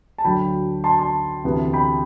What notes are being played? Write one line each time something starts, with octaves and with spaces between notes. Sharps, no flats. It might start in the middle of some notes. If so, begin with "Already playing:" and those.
A5
D2 D3 F#3 G5 B5
A5 C6
A5 C6
D2 C3 E3 B3
G5 B5